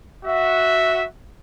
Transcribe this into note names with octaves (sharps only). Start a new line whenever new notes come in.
F#4 E5